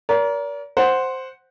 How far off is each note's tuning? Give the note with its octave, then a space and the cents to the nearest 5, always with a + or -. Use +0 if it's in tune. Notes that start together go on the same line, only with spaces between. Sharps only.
A#4 +20 D5 -40
C5 +0 F#5 +0